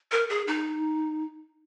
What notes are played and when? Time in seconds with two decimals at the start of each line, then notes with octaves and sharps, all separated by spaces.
0.12 A#4
0.30 G#4
0.47 D#4